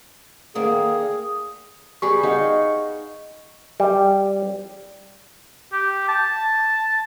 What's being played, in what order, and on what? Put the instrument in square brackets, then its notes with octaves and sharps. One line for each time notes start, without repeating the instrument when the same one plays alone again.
[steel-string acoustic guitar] D3 D#3 A#3 [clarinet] G#4
[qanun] G3 G#4 B4 [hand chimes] C#6
[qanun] D#4 F5 F#5
[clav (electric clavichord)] G3
[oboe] G4
A5